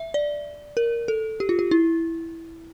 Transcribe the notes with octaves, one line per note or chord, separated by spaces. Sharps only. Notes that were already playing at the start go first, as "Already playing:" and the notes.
Already playing: E5
D5
A#4
A4
G4
F4
G4
E4